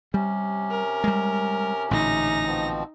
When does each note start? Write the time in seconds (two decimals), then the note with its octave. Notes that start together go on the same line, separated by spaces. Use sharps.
0.14 C3 G3 C#4
0.71 A#4
1.04 G3 G#3
1.91 A1 A#2 D3 D#4 A#6
2.46 B2 F3 C4